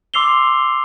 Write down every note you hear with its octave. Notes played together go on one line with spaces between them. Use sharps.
C6 D6 E6 C7 F7 G7